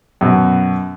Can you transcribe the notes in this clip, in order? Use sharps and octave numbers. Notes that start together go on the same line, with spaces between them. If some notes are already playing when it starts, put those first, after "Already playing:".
F#2 B2